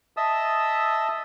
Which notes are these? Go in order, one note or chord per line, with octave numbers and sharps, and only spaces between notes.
D#5 E5 A5 D#6 E6